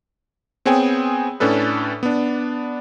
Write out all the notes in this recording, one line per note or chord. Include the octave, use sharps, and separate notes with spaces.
B3 C4 G#4 C#5 G5 G#5
A2 C#4 D4 A4 B4
B3 D4